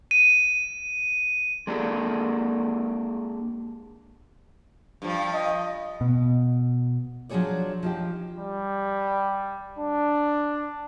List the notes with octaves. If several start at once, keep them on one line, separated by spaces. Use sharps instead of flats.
D#7
G#3 A#3 D4 G4 A4
G2 F3
D#5
B2
F3 F#3 D4 G#4 C#5 D5
F3 D#4 G4
G3
D4